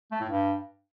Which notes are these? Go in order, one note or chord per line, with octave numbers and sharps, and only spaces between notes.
A3
A2
G2